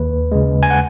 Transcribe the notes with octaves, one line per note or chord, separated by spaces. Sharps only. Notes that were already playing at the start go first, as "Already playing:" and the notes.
Already playing: D#2 B4
C#3 G#3
G#5
F#5